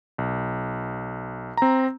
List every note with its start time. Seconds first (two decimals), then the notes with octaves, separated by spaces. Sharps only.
0.18 B1
1.57 C4 A#5